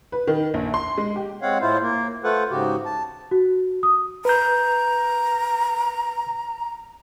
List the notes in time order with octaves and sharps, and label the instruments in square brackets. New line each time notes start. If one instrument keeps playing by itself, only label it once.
[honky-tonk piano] B4
D#3
A#1
C6
G#3
G4
[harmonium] G#3 C4 C#5 F5 F#5
A2 E4 F4 C5
A#3
A3 F4 A4 B4 C5 F#5
G#2 C#3 F#4 G4
A5
[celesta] F#4
D#6
[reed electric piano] B4 G6 [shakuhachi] A#5